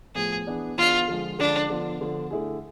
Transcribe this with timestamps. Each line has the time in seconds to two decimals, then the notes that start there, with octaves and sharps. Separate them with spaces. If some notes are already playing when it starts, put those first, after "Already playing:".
0.15 A2 F3 B3 G#4
0.47 E3 B3 D4 G#4 D5
0.78 E3 B3 D4 F4 G#4 D5
1.08 D3 F3 G#3
1.39 D3 F3 G#3 D4
1.70 D3 F3 B3 F4 A4
2.01 D3 F3 B3 F4 A4
2.31 D3 A3 E4 G#4